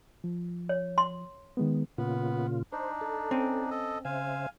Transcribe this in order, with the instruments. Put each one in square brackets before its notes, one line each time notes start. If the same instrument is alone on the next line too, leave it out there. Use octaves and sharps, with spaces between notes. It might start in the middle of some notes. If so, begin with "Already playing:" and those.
[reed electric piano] F3
[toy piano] C#5
C6
[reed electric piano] D#3 G#3 B3
[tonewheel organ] A#2 C#3 F4 [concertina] B3
[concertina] D4 D#4 [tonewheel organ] C5
[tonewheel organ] A4
[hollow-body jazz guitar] C4 C#4
[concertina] A4 D#5
[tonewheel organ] C#3 C5 E5 [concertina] F5 G#5